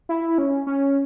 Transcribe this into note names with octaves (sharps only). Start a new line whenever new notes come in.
E4
C#4
C#4